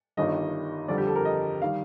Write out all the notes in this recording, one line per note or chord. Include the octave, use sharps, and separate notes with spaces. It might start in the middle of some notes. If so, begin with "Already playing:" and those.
G1 G2 D#3 G3 D#5
F2 D3 G3 D5
G4
A4
A#4
D#5
D#3 G3 F5